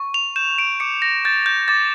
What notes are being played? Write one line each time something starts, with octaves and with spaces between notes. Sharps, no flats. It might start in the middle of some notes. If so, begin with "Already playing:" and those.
Already playing: C#6
F7
G6 E7
D7
D6 C#7
A#6
G6 A6
G6
D6 A6